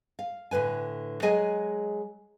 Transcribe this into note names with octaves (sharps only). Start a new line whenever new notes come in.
F5
A2 D3 B4 G#5
F#3 G#3 G#4 D#5 G#5